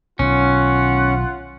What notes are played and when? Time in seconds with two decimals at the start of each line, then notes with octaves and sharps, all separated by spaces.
0.19 B1 D#3 C#4 F4 F#5